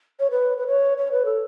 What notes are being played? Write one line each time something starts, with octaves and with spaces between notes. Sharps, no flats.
C#5
B4
B4
C#5
C#5
B4
A4